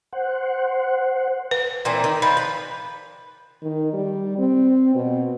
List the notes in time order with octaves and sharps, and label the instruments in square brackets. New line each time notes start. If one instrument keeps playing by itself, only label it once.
[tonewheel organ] C5 F#5
[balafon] B4
[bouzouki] A#2 E3 C4
D#3
[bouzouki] F3 [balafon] B5
[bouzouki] B4
[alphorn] D#3
G3
C4
B2